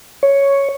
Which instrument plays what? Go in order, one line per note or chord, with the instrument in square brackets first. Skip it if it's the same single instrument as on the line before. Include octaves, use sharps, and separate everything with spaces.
[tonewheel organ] C#5